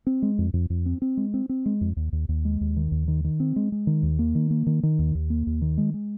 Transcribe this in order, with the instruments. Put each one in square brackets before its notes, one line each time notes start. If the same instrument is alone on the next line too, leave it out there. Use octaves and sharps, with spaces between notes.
[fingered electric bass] C4
G#3
F2
F2
F2
C4
C4
G#3
C4
C4
G#3
F2
D#2
D#2
D#2
G#3
D#2
D#3
D#2
D#3
D#3
C4
G#3
G#3
D#3
D#2
A#3
D#3
A#3
D#3
D#3
D#2
D#2
A#3
D#2
D#3
G#3
G#3